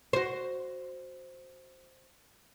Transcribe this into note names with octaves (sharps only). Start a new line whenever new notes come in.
F#4 C5